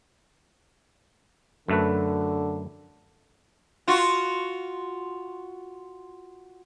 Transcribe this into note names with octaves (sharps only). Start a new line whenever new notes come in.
F#2 D3 A3 B4
F4 F#4